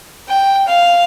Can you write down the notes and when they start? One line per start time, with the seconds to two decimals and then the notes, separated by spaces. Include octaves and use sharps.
0.28 G5
0.68 F5